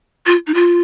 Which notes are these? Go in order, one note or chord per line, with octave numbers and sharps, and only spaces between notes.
F4
D#4
F4